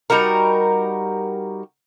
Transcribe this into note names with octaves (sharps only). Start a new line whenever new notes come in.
G3 D#4 F#4 A#4